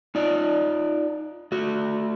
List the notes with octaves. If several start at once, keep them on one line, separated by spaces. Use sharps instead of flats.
D#4 F4 D5
A3 F#4